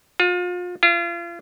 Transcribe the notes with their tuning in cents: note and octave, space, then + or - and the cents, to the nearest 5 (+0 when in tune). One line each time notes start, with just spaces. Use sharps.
F4 +35
F4 -35